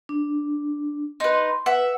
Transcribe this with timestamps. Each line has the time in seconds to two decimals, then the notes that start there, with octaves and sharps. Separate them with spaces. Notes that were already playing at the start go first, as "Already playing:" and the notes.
0.09 D4
1.20 D#4 B4 C6
1.66 B4 E5 F#5